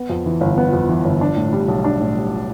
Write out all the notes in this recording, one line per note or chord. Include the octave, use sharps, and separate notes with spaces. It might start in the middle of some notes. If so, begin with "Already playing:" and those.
Already playing: B3
F2
E3
G1
B3
F2
E3
G1
D4
A2
G3
B1
D4
A2
G3